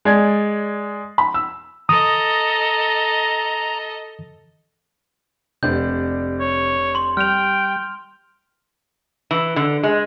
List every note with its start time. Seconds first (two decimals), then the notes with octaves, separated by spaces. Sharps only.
0.05 G#3 D5 G#6
1.18 B5
1.34 E6
1.89 A4 D#5 A#5 D#6
5.63 F1 C3 D4 D5 G6
6.40 C#5
6.95 C6 F#7
7.17 G3 G5 F6 F7
9.31 E3
9.56 D3
9.83 G#3